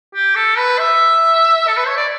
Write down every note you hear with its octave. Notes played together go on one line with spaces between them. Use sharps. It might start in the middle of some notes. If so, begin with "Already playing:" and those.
G4
A4
B4
E5
A4
B4
C#5
D5